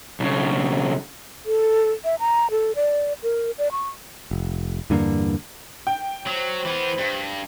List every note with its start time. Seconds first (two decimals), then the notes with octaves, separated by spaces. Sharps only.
0.20 B1 C#3
1.46 A4
2.04 E5
2.20 A#5
2.51 A4
2.76 D5
3.23 A#4
3.58 D5
3.72 C#6
4.31 F1
4.90 E2 G2 D3 A#3
5.87 G5
6.27 F#3 C5
6.65 E3 B3
6.98 G2